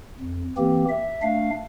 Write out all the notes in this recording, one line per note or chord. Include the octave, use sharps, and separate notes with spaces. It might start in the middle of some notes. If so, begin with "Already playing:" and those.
F2
E3 A#3 C4 G4
E5
A3 D4 F5